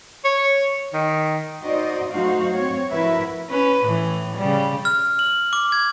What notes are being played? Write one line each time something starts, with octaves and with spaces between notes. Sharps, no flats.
C#5
D#3
D#4 F#4 C5 D5 D#5
F#3 A3 D#4 F#4 C5 F5
C4 C#5
F3 E4 F#4 A#4 B4 E5
C#4 B4
A2 E3
C#3 G3
F6
F#7
D6
G#6